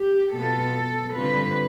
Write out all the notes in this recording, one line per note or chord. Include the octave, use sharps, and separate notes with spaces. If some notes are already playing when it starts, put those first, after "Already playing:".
Already playing: G4
B2 B3 F4 A4
D3 G3 C4 F4 B4